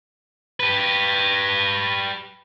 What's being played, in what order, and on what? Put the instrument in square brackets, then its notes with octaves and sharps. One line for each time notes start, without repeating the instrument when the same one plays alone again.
[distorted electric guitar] G4 B4